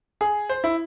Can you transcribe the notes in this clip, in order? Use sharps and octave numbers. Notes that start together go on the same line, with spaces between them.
G#4
C5
E4